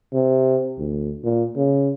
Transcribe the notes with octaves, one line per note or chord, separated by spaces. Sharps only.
C3
D2
A#2
C#3